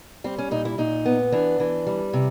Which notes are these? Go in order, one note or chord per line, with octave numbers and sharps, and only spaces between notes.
G3 C4
C#4
A#2 D#4
E4
A#2 D#4
B3
E3 D4
E3
G3
C3